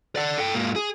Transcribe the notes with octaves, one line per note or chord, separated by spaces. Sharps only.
D5 F#5
A4 G5
G#2 A#3
G#4